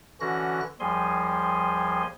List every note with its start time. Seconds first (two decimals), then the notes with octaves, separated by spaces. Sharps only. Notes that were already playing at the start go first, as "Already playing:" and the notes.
0.20 D3 E3 C#4 F#4 F#6 A#6
0.80 D#2 F3 G3 G#4 G#5 C6